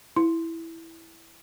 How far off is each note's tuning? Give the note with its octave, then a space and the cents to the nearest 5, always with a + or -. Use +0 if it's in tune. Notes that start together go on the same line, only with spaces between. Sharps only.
E4 +0 C6 +0